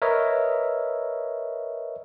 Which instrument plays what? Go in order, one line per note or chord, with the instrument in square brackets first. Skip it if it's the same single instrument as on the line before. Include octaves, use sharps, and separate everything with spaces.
[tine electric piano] A#4 B4 C#5 D#5 E5